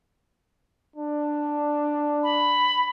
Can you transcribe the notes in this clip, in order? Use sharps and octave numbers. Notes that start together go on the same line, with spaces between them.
D4
B5